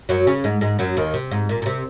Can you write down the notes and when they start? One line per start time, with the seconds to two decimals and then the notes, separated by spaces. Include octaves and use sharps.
0.09 F#2 F#3
0.27 C#3 C#4
0.44 G#2 G#3
0.61 G#2 G#3
0.79 F#2 F#3
0.97 D#2 D#3
1.14 C3
1.31 G#2
1.49 A#2
1.62 A#2
1.66 C3